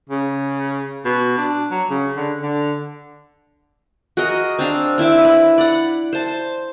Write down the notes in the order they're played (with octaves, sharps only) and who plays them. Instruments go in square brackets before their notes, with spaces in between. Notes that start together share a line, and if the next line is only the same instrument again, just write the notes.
[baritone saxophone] C#3
B2
D4
F#3
C#3
D3
D3
[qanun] F#4 G#4 A#4 D#5
C4 D4 F5
C4 E4 E5 D6
B4 B5
D5 F#5
C5 A5